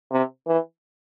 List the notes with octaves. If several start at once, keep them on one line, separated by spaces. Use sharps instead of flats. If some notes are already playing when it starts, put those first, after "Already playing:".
C3
E3